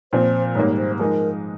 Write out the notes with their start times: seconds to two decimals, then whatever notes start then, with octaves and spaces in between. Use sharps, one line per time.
0.13 A#2 F3 C4 C5
0.55 G#2 D#3 G3 A#3 C#5
0.77 C5
0.99 F3 G#3 D#4 A#4